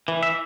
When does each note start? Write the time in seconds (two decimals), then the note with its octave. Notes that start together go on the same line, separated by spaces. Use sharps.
0.08 E3
0.23 E5